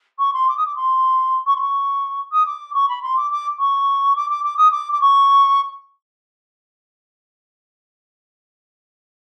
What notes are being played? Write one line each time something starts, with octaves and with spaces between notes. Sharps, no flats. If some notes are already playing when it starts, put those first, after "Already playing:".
C#6
C6
D6
D#6
D6
C6
C#6
C6
C#6
D#6
D6
C#6
B5
C6
D6
D6
C#6
D6
D6
D6
D#6
D6
D6
C#6